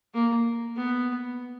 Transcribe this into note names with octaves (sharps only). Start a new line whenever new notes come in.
A#3
B3